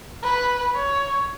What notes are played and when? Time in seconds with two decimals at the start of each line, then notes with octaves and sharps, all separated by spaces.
0.23 B4
0.75 C#5